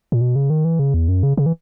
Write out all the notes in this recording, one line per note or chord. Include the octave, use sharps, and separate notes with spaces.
A#2
B2
C#3
D#3
E3
C#3
E2
F#2
C#3
C#3
E3